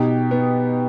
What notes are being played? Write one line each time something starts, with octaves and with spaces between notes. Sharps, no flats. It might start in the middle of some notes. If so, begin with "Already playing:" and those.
Already playing: B2 D#4 G4
B3